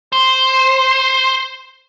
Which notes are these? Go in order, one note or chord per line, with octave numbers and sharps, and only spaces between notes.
C5 C6